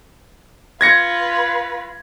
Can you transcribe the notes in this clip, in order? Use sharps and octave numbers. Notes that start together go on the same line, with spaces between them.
F4 B4 G#6 A#6 C#7